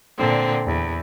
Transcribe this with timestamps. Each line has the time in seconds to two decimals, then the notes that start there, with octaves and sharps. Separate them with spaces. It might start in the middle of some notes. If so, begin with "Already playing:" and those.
0.16 A#2 D3 C4
0.66 E2